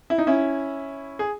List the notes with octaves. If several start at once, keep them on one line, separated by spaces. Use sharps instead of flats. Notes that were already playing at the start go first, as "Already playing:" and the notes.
E4
D#4
C#4 E4
G#4